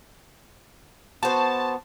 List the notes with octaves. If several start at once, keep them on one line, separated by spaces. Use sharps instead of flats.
B3 F#4 C5 A5